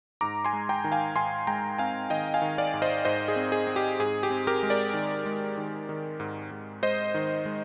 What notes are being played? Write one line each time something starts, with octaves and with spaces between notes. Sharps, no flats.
G#2 A#5 D6
G#5 C6
G#3
G5 A#5
D#3
F5 G#5
G#2 G#5 C6
G#3 G5 A#5
C4 F5 G#5
D#3 D#5 G5
F5 G#5
D#3
D5 F5
G#2
C5 D#5
G#2 C5 D#5
G#4
C4
G#4
C4
G4
G#2 G#4
G4
C4
G4 A#4
G#3
A#4 D5
D#3
G#3
D#3
D#3
G#2
G#2
G#3 C5 D#5
D#3
G#3